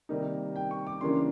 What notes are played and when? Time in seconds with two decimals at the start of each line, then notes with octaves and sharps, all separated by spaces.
0.09 C3 D#3 G3 A#3 D#4
0.56 G5
0.71 C#6
0.87 D6
1.01 C#3 E3 G3 A#3 D4 C6